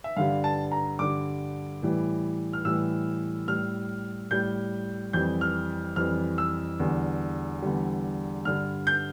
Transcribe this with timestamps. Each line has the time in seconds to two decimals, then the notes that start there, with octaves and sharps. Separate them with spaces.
0.04 E5
0.16 G2 D3 G3 F5
0.44 A5
0.72 A#5
0.99 G2 D3 G3 D6
1.83 A2 E3 G3
2.53 F6
2.65 A2 E3 G3 E6
3.48 A2 G3 F6
4.31 A2 G3 G6
5.13 F2 E3 G3 G6
5.41 F6
5.96 F2 E3 G3 F6
6.38 E6
6.80 E2 D3 G3
7.62 E2 D3 G3
8.45 G2 D3 G3 F6
8.87 G6